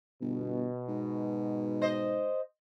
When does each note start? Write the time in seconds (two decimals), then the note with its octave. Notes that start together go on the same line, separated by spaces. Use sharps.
0.21 G1 B2
0.88 G#2
1.82 C5 D#5